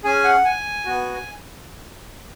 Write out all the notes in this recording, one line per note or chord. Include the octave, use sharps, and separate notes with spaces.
C#4 G#4 G#5
F#5
G#5
B3 F#4